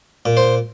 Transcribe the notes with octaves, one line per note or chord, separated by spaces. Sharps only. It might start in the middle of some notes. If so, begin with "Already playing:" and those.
A#2
C5